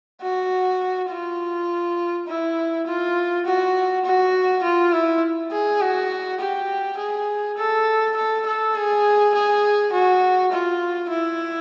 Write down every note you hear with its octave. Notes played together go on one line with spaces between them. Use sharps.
F#4
F4
E4
F4
F#4
F#4
F4
E4
G#4
F#4
G4
G#4
A4
A4
A4
G#4
G#4
F#4
F4
E4